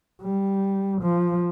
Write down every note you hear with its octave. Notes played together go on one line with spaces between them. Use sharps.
G3
F3